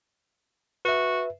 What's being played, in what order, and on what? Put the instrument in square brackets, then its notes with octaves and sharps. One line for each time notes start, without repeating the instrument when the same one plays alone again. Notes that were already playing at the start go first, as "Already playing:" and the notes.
[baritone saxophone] F#4 [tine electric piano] B4 E5